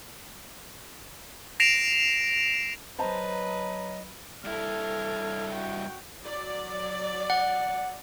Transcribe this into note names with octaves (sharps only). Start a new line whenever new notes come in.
A#6 C7 D7 E7 F7
F#3 B4 C5 D#5 A5 A#5
G2 E4 A4 F6 G#6
F#4 G5
F#3 D5
F#5